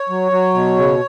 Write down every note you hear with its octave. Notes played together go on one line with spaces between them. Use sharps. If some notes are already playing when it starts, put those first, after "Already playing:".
Already playing: C#5
F#3
F#3
B2
C#3